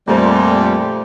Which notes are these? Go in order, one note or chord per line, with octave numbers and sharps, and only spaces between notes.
F2 A#2 G3 A3 G4 C5